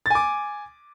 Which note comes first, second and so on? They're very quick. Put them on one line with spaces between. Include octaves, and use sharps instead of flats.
A6 G#5 D6